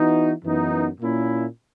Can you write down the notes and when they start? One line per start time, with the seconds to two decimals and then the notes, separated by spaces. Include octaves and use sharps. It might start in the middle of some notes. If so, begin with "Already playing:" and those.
Already playing: E3 B3 D#4 F#4
0.44 F#2 E3 B3 D#4
1.00 A#2 A#3 C#4 E4